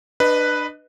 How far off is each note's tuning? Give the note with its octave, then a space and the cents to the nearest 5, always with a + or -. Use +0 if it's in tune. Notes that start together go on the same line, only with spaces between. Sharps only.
D4 +30 B4 +0 D#5 +0